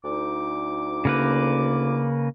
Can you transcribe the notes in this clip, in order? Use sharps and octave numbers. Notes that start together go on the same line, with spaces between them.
D2 D#4 D6
C#3 A#3 B4